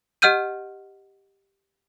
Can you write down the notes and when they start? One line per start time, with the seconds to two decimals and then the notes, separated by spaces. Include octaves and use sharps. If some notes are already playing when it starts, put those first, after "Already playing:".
0.22 G4 D#5 F#5 F6 G6 D#7